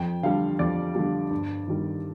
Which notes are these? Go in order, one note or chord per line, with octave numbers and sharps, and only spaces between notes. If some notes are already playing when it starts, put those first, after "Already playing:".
Already playing: F2 G5
D3 G3 F5
F2 D5
D3 G3
G2
D#3 G3